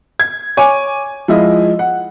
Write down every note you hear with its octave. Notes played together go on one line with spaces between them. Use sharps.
G#6
C#5 G#5 D6
F3 G#3 E4 F4 D#5
F#5